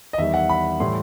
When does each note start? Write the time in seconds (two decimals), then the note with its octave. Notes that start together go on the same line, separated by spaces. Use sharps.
0.13 D#5
0.18 E2 D#3 G3 E5
0.34 F#5
0.49 B5
0.80 A2 E3 G3 C6